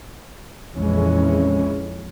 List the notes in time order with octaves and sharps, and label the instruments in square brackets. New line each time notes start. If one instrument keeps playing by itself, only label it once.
[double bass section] A#1 F2 E3 G#3 C#4